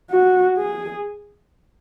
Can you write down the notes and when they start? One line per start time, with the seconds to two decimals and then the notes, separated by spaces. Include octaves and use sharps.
0.11 F#4
0.58 G#4